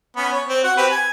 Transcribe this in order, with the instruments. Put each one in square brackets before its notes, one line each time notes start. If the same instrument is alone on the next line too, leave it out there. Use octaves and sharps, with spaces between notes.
[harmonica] B3 C#4
C#5
C4
F#4 F#5
C4 G4 B4
G#5